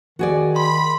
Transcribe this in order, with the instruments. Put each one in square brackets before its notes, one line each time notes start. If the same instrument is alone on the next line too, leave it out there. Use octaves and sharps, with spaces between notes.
[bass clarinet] D#3 [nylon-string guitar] F#4 G#4 D5
[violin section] B5 [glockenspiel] C6